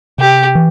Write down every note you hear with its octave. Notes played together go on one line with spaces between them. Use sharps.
C3 G4
E3